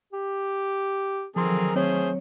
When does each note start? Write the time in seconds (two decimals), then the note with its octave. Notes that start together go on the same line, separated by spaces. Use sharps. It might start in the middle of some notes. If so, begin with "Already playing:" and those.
0.13 G4
1.36 D3 D#3 F3 F#3 C4 G#4 A#4 C6
1.76 A3 C4 G#4 C5 C#5